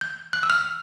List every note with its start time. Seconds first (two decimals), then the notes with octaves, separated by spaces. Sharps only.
0.01 G6
0.33 F#6
0.43 E6
0.50 F6